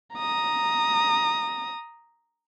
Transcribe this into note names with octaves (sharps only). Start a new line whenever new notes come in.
A#5 D#6